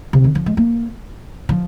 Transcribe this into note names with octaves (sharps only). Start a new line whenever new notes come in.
C3
D#3
F3
G#3
A#3
F3